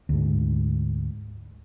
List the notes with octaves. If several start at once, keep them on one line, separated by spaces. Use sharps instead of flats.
D2 G#2